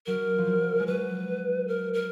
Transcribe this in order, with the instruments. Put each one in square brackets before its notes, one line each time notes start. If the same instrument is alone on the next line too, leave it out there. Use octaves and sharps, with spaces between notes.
[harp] F#3 [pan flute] A#4
[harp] F3
F#3
G#3
[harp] F#3 [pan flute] B4
[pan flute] A#4
A#4